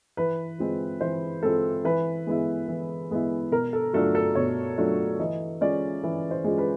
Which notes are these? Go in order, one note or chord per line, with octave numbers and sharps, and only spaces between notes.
E3 B4
G#3 C4 F4
E3 C5
G#3 C4 F4 A4
E3 B4
G#3 B3 E4
E3
G#3 B3 E4
B2 A#4
A4
F#3 A3 D4 F4 A4
A4
B2 C#5
F#3 A3 D4 F4
E3 D#5
G#3 C#4 F4 D5
E3
C5
G#3 C#4 F4
B4